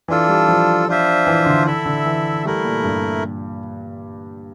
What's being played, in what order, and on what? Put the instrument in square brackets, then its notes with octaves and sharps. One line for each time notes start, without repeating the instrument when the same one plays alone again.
[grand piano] E3 [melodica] D4 F4 A4
[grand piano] G3
F3
[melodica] D4 F4 C5 E5
[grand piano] E3
D3
[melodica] E4 A4 E5
[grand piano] D3
E3
[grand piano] G3 [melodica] A3 E4 A#4
[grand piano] A#2
G2